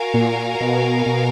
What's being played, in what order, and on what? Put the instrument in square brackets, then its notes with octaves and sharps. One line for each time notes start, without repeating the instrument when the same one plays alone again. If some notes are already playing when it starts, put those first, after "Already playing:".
Already playing: [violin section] F#4 A#4 F5 G#5
[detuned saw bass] A#2
B2
B2